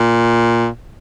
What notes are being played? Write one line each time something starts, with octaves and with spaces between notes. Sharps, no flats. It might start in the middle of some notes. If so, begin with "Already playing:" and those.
Already playing: A#2